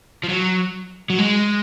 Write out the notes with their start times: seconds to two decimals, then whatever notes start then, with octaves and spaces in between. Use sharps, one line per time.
0.23 F3
0.29 F#3
1.10 F#3
1.19 G#3